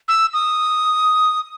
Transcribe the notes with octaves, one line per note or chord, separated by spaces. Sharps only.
E6
D#6